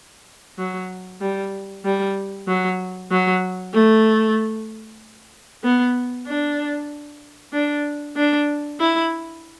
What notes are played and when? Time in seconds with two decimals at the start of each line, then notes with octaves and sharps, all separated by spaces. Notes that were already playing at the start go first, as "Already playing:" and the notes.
0.59 F#3
1.21 G3
1.85 G3
2.48 F#3
3.11 F#3
3.74 A3
5.64 B3
6.27 D4
7.53 D4
8.17 D4
8.80 E4